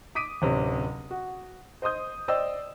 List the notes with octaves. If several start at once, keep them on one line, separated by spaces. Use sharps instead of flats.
D6 D#6 B6 D7 D#7
D1 C3 C#4
F#4
C5 D#5 C6 D#6 G6
C5 D5 D#5 G5 E6